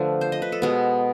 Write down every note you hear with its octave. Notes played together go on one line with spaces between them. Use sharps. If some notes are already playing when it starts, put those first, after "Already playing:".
Already playing: D3 F3 A3 B4
C5
D#5
B4
A4
B2 G#3 B3